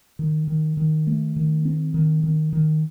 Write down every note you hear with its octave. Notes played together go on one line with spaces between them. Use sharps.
D#3
D#3
D#3
A3
D#3
C4
D#3
D#3
D#3